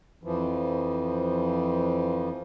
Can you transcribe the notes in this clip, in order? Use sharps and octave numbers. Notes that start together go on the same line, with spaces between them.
F2 E3 F3